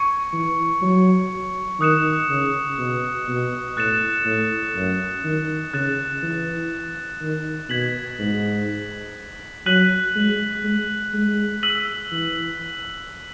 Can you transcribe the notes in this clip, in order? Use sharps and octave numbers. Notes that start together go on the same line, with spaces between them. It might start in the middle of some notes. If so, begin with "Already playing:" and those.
Already playing: C#6 G#6 C#7
E3
F#3
D#3 D#6 F#6 C#7 E7
C#3
B2
B2
A2 F#6 A6 C#7 E7
A2
F#2
D#3
C#3 F#6 A6 E7
E3
D#3
B2 G#6 B6 F#7
G#2
F#3 F#6 B6 D#7 F#7
G#3
G#3
G#3
E6 B6 D#7 F#7
E3